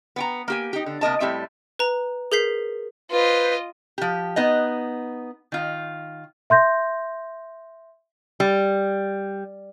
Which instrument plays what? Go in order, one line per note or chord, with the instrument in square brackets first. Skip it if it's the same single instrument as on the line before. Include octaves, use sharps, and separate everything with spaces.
[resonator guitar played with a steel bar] B3 G5 A#5
A#3 G4 G#5
D#4 G4
D3
C3 A#3 D#5 A5
A2 G3 C4 E5
[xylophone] B4 A#5
G#4 A#4 G6 B6 C7
[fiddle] F4 D#5 [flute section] B4 C5
[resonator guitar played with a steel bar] F3 G4
B3 D#4 D#5
D#3 F4
[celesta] E5 C6 G6 A#6
[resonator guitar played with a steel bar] G3